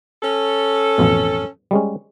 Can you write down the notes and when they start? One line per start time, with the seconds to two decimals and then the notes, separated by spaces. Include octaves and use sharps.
0.23 C#4 A4
0.98 A1 F2 B2
1.71 G3 G#3 C#4